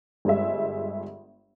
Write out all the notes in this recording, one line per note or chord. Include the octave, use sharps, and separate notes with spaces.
G1 G3 G#3 E5